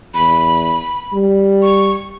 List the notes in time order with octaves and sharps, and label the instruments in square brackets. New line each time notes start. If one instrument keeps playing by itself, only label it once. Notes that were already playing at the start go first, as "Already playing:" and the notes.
[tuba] E2 [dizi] B5
[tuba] G3
[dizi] C#6